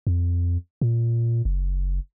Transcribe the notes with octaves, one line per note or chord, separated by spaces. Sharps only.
F2
A#2
F#1